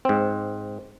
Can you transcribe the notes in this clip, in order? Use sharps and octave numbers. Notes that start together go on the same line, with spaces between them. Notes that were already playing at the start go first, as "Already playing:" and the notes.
G#2 C4